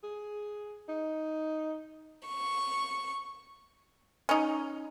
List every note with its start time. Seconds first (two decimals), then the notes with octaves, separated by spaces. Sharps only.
0.03 G#4
0.88 D#4
2.29 C#6
4.29 C#4 D#4